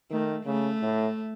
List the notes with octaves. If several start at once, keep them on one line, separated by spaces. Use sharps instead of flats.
D#3 A3
C#3 A3
A2